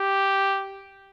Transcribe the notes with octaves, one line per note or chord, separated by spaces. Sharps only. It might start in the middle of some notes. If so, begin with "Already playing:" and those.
Already playing: G4